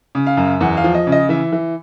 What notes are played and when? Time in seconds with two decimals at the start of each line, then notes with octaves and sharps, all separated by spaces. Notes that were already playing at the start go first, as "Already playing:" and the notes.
0.15 C#3
0.26 F5
0.37 F#2
0.60 E2 F#5
0.77 F5
0.84 F3
0.95 D#5
1.07 C#3
1.12 D#5
1.29 E3 E5
1.52 E3